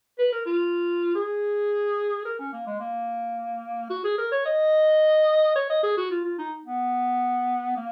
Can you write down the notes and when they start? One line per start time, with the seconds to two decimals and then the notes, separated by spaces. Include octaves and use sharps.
0.19 B4
0.32 A#4
0.46 F4
1.15 G#4
2.25 A#4
2.39 C#4
2.53 A#3
2.66 G#3
2.80 A#3
3.90 F#4
4.04 G#4
4.18 A#4
4.32 C#5
4.45 D#5
5.55 C#5
5.70 D#5
5.83 G#4
5.97 F#4
6.11 F4
6.25 F4
6.38 D#4
6.66 B3
7.76 A#3